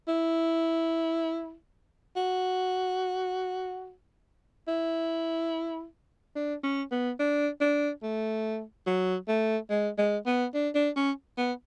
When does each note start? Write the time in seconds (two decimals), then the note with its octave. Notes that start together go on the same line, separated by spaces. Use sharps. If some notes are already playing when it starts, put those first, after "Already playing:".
0.08 E4
2.16 F#4
4.68 E4
6.35 D4
6.63 C#4
6.91 B3
7.19 D4
7.61 D4
8.03 A3
8.87 F#3
9.28 A3
9.70 G#3
9.98 G#3
10.26 B3
10.54 D4
10.75 D4
10.96 C#4
11.38 B3